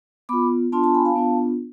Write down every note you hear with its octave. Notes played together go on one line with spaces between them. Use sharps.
B3 F4 B5 D6
B3 D4 F4 A5 C6
A5 C6
G#5 B5
F5 A5
B3 D4 F4